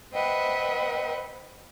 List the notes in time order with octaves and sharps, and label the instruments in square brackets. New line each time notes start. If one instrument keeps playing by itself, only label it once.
[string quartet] B4 C5 D#5 E5 F#5 G5